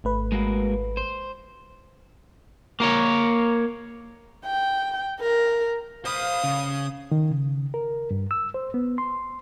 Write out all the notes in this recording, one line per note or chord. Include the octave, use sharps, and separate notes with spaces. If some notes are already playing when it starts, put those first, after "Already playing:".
G#1 A3 B4
G#3 A#3 F#4
C5
A#3 A#4 C#5
G5
A#4
C5 F5 B5 D#6
C#3
D#3
C#3
A#4
G2
E6
C5
B3
C6